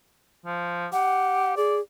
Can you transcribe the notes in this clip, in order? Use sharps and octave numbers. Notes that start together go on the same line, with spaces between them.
F3
G4 F#5
G#4 D5